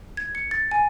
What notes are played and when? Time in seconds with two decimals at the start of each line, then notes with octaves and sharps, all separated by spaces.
0.17 G#6
0.35 C#7
0.51 A6
0.71 G#5